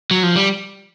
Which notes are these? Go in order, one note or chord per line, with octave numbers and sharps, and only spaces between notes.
F#3
F3
G3